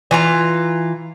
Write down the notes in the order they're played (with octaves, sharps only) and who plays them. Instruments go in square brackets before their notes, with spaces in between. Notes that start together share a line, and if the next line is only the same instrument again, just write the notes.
[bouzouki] E3 F4 A#5